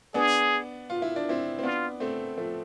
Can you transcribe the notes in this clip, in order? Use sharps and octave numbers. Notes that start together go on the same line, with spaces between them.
B3 D4 G#4
F4
E4
D4
C4 E4
C4
B3 D4 F4
A3 C4
F3 A3